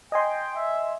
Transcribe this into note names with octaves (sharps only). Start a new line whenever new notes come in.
D#5 G5 G#5 C6
E5